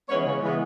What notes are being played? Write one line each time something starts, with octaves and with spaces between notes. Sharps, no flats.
E3 G#3 B3 C#4 C#5
C#3
E3 G#3 B3